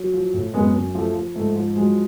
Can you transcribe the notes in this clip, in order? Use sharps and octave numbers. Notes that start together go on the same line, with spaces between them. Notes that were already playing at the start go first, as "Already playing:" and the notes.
Already playing: F#3
F3
A2
F#2 G#3 B3
F#2
F3 A3
F3
G#2 A3
F3
F#3 G#3